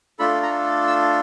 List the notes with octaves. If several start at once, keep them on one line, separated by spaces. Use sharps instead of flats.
A3 D4 F4 A4 B5
A#5
E6